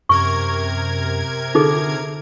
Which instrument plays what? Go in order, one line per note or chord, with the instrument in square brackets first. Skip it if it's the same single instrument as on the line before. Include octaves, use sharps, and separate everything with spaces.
[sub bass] F#2 [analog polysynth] C3 A#4 G#6 [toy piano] C#6
[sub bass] D3 [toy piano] D#4 G#4 A4